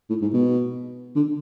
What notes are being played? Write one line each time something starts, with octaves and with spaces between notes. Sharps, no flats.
A2
G#2
B2
D3